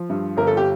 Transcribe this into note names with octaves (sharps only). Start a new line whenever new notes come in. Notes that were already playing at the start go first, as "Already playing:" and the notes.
Already playing: F3
G2
G1 A#4
A4
G4